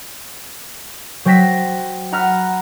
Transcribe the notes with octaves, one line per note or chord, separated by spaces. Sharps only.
F#3 C5 G5 A#6 B6 E7
F#5 A#5 B5 F6